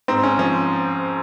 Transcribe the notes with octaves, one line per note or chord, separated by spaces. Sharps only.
G#2 C4
G#2 C#4
F3 C#4